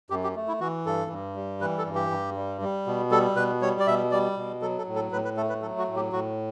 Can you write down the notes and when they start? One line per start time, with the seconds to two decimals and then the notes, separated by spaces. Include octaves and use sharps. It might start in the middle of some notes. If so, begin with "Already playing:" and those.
0.10 F#2 G4
0.24 G4
0.35 A3
0.48 E4
0.60 E3 F#4
0.86 G2 A4
1.11 G2
1.36 G3
1.61 E3 B4
1.78 A4
1.86 G2
1.95 G4
2.11 G2
2.36 G3
2.61 G3
2.87 B2
3.11 G3 A4
3.36 B2 B4
3.62 G3 C#5
3.80 D5
3.87 B2 E5
4.11 G3 D5
4.37 B2
4.62 F#3 A4
4.78 A4
4.87 A2
4.96 A4
5.12 A2 B4
5.25 B4
5.37 A3 A4
5.49 B4
5.62 F#3 A4
5.78 F#4
5.88 A2
5.96 G4
6.12 A2 F#4